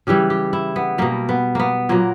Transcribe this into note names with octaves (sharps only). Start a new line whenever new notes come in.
C#3 E3 G3 G4
G4
E4
B3
B2 G3 A#3
B3
A#3 B3
A#2 F#3 A#3